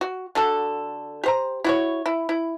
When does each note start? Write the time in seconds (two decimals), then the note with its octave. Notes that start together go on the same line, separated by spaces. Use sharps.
0.01 F#4
0.35 D3 F#4 A4
1.24 G4 C5 A#5
1.64 E4 F#4 C#5
2.06 E4
2.29 E4